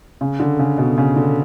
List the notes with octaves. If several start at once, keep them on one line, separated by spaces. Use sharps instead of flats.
C#3
D3
C#3
B2
C#3
D3